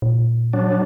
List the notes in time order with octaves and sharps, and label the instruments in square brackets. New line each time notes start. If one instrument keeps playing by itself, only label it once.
[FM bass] A#2
[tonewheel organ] F#3 D4